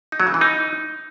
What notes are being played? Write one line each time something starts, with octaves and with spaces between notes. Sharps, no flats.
D#4
F#3
C#3
E3
D#4